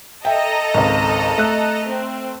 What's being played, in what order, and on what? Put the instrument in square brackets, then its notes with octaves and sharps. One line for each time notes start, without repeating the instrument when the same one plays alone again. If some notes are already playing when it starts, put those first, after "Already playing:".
[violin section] A4 D#5 A#5 [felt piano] E5 G5
[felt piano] G#1 C#2
A3 F#6
[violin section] C4